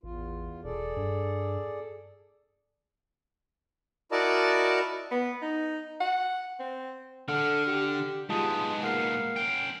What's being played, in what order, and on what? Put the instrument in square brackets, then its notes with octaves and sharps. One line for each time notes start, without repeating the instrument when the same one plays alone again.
[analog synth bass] A1 [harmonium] E2 F4
[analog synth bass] E1 [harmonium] G#4 A4 D5
[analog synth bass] G2
[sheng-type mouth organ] E4 F#4 A#4 D5 D#5 A5
[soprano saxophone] B3
D#4
F#5
C4
[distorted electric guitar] D3 [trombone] A4 [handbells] F#5 F6
[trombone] G4
[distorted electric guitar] G#2 B3 [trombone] G#3 [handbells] F4 A5 D#6
[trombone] A#3 [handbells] F#5 F6 C7
[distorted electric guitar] C#4 G5